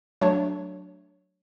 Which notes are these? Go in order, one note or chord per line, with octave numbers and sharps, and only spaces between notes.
F#3 A3 D4 C#5